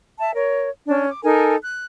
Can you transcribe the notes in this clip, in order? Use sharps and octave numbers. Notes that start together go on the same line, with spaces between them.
E5 A5
A#4 C#5
C#4 D4
D6
D#4 A4 A#4 G#5
F#6